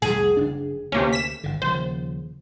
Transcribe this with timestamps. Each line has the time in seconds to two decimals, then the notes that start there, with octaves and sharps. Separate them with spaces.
0.02 C2 F2 A2 G#4
0.37 F#1 D4
0.92 D2 C3 A#3 C#4
1.13 B6 E7
1.44 G1 D3
1.62 D#1 C#3 F3 C5